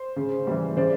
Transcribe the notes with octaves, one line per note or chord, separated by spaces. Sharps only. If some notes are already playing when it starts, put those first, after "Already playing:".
Already playing: C5
C#3
E3 G3
C#3 C5 D5